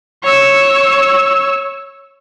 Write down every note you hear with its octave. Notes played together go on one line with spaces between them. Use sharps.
C#5 E6